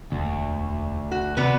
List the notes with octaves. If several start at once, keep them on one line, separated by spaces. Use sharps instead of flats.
E1 D2 D4
F#4
C3 B3 F#4 B4 D5